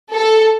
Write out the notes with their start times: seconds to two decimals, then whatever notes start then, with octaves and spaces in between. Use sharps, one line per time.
0.13 A4